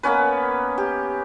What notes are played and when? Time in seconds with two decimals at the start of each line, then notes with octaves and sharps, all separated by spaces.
0.03 A#3 B3 C#4 B4
0.78 G4